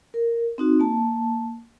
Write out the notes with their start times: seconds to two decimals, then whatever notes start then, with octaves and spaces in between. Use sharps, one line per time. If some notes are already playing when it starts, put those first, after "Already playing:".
0.14 A#4
0.58 C4 D#4 F#4
0.80 A#3 A5